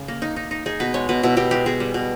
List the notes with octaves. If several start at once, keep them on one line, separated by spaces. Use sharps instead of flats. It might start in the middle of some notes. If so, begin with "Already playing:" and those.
Already playing: C#3
A#3
D#4
D#4
D#4
D#4 G#4
B2 B4
G#3 C#5
B2 B4
B2 E4
B2 G4
G#3 G4
B2 G#4
G3
B2